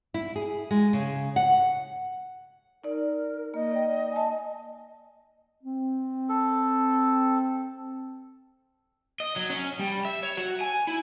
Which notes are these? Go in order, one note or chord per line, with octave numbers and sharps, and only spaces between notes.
E4
G#4
G#3
C#3
F#5
D#4 A#4 D5
A#3 D#5
D5 G5
G#5 A5
C4
A4
D#5
F#3
C#4
G3
E5
C#5
F#4
G#5
E4